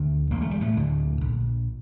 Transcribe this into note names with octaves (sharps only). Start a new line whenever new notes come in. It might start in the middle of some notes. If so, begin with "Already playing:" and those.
Already playing: D2 D3
E1 A#3
A3
G3
A2 A3
D2 D3
A#1